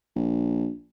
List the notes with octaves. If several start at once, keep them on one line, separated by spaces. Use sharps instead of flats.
A#1